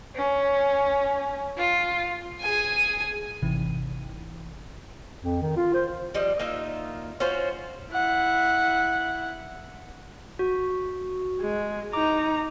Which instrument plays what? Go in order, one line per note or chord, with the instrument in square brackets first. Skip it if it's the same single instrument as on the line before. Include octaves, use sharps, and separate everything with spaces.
[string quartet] C#4
F4
[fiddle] G#4 G#5
[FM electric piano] G#1 C3 E3
[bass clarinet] F2
D#3
F4
C5
[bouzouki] F3 G3 D#5
A#3 D#4 F4 E5
C#4 F4 F#4 C5
[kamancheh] E4 F#5
[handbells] F#4
[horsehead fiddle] G#3
[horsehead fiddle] D#4 A#5 [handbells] D6